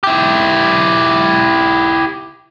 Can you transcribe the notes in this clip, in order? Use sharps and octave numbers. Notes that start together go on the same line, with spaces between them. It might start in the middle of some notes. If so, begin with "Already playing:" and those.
E4 G4